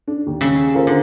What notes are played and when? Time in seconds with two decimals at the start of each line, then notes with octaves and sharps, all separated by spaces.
0.08 D4
0.27 D#2
0.41 C#3 E5
0.74 F4 A#4 C5
0.87 D3